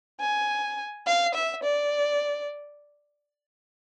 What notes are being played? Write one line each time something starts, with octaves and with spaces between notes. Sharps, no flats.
G#5
F5
E5
D5